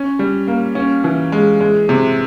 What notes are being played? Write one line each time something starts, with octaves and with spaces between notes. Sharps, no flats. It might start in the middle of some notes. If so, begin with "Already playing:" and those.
Already playing: C#4
G3
A#3
C#4
E3
G#3
G#3
C3